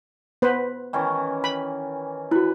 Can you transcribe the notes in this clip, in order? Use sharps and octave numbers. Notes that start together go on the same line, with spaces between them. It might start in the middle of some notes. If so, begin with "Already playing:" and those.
B3 B4 C5
D#3 E3 C#4
B5
E4 F#4 B4